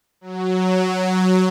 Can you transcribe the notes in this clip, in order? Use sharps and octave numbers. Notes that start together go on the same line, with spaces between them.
F#3